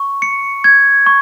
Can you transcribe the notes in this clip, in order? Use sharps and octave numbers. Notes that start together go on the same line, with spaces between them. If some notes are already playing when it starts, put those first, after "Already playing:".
Already playing: C#6
C#7
G#6
C#6